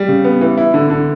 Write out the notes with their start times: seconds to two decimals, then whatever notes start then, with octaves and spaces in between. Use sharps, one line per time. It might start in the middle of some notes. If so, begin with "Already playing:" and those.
Already playing: G3
0.08 C#3
0.24 B3
0.41 E3
0.58 E4
0.74 D3
0.90 D3